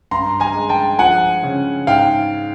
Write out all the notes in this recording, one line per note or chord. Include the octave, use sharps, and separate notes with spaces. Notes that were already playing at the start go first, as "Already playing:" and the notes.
G2 A#5 C6
G#5 A#5
G#3
G5 A5
F3 F#5 G#5
C#3
G#2 F5 G5